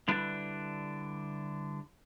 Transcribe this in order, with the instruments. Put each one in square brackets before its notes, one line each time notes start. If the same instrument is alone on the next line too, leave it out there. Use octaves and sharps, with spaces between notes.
[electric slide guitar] D3 G3 D4 E4 B4